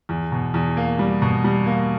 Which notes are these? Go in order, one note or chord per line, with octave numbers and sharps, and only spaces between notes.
E2
B2
E2
A#3
G3
B2
G3
A#3